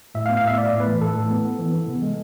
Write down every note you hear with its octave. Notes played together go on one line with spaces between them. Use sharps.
A2 E5
F5
B3
F5
A2 E5
B3 D5
A2
B4
E3
A2 A4
A2
B3
B3
E3
B3
C3
G#3